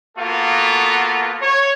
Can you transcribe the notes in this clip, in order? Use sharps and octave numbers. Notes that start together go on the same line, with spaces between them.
A#3 B3 F4 F#4 A4
C#5